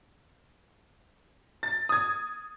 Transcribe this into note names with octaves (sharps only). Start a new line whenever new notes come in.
A6
D#6 G#6